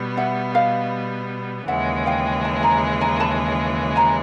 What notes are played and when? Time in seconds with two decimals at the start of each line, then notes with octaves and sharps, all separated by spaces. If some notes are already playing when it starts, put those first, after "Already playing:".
Already playing: B2 G3 B3
0.17 E5 F#5
0.55 D#5 F5
1.68 D#2 C#3 E3 G#3 E5 F#5
2.06 F5 G5
2.45 G5 A5
2.63 G#5 A#5
3.01 G#5 A#5
3.20 A5 B5
3.96 G#5 A#5